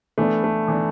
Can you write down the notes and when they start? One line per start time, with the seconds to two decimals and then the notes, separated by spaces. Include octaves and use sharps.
0.18 E3 A3 B3 D4
0.44 A3
0.68 E3 B3 D4